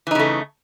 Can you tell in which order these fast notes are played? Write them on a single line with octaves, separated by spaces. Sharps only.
E3 D#4 C#3 A3